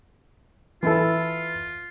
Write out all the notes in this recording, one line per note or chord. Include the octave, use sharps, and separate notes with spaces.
E3 E4 F4 A4